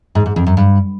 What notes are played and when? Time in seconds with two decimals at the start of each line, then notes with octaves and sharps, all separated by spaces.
0.15 G#2
0.26 G#2
0.36 F2
0.47 F#2
0.57 G2